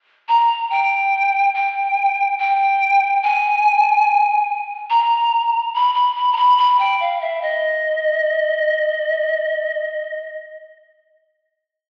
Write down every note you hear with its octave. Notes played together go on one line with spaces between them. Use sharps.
A#5
G5
G5
G5
G#5
A#5
B5
B5
B5
A#5
B5
B5
G5
F5
E5
D#5